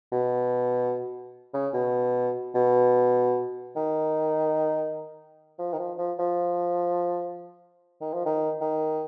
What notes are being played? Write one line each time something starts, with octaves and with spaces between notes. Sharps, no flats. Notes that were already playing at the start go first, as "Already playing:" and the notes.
B2
C#3
B2
B2
D#3
F3
D#3
F3
F3
F3
D#3
F3
D#3
D#3